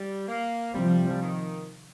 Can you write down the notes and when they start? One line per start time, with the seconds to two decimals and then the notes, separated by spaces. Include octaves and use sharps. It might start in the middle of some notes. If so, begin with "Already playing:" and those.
Already playing: G3
0.28 A#3
0.75 C3 F3 G3 C4
1.22 D#3